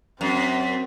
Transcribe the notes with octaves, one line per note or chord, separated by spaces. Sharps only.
F#2 C4